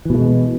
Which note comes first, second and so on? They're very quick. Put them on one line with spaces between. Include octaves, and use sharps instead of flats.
E3 B2 A3 G#3